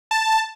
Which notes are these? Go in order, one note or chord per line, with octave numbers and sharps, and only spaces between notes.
A5